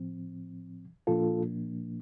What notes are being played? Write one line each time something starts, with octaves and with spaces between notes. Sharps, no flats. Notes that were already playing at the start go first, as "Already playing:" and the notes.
Already playing: A2 F3 C4
A#2 F3 A#3 D4 F4 A4